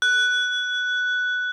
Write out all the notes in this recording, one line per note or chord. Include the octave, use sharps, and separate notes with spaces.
F#6